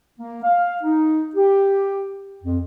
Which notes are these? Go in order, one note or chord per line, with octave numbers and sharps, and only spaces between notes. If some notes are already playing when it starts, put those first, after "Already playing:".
A#3
F5
D#4
G4
F2